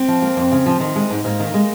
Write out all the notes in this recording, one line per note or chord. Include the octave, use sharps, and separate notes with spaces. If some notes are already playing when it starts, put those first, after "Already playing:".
Already playing: C4
F3
A#3
F2
C#3
F3
D#3
G#3
G#2
G#2 A#3
D#3
G#3